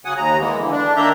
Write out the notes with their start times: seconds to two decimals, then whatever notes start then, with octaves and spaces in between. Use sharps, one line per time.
0.05 C#3 F#3 F#5 G#5 D#6
0.17 D#2 A#5
0.40 E3 G#3 A#3 B3
0.58 D3 E3
0.72 D4
0.97 D#3 A#3 D4 E5 A#5 G6